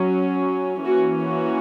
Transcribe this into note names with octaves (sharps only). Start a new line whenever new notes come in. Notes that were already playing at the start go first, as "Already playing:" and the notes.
Already playing: F#3 C#4
E3 A#3 C#4 F#4
F#4